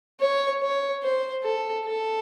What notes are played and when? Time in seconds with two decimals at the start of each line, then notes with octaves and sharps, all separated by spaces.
0.20 C#5
0.62 C#5
1.03 C5
1.44 A4
1.85 A4